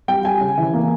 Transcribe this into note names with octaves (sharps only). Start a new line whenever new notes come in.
G3 G5
G3 G#5
C#3
E3
A#3